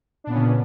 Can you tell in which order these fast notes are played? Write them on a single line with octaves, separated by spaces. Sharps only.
D4 A#2 B3 C#4 C#3